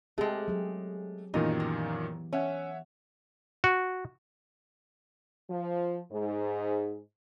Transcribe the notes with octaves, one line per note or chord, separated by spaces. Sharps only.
G#3 A3 C4 G4 G#4
F#3 G#4
F#2 A#2 D#3 E3 B3 D#4 G4
A#3
C#4 C#5 E5 F#5
F#4
F3
G#2